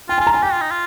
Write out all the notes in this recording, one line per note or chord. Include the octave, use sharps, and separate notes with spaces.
F4 G5
G#5
F4
A#5
F4 G#5
G4 G5
F4
D#4
F4